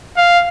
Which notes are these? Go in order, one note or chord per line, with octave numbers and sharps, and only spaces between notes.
F5